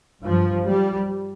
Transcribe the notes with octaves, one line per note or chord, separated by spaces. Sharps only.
G2 F3
G3